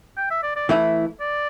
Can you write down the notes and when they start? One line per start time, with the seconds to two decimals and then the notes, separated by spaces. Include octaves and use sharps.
0.17 G5
0.30 E5
0.43 D5
0.56 D5
0.69 E3 A3 E4
1.21 D5